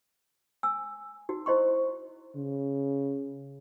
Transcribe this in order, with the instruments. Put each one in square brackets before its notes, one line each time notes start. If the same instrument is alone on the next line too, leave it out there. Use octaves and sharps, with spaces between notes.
[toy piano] G#5 E6
D#4 F#4
E4 C5 D#5 C6 C#6
[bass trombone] C#3